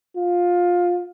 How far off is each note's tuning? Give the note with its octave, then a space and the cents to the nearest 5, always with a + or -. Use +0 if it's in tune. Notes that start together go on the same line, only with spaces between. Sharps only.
F4 +15